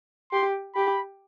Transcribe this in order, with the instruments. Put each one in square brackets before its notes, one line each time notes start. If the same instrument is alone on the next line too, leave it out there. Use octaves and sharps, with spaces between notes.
[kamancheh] G4 [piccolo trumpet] C6
[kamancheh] G4 [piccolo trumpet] B5